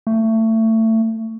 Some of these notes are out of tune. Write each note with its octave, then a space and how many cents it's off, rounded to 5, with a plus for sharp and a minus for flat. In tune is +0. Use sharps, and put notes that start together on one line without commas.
A3 +25